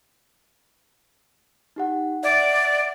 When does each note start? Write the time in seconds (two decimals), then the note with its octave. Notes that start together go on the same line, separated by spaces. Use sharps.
1.76 D#4 G4 F#5
2.23 D5 E5 F#5 G#6